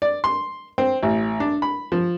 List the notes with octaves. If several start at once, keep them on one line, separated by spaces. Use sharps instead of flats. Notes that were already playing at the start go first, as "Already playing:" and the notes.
D5
C6
C4
A1
D4
B5
F3